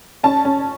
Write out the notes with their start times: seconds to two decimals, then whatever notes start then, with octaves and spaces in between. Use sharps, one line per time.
0.23 C#4 A5
0.45 C#4